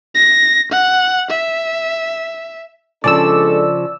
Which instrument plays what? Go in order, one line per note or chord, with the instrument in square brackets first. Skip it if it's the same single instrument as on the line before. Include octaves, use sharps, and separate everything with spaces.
[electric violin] A#6
F#5
E5
[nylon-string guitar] C#3 F3 [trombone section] G#3 D4 A4 [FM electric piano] D5 E6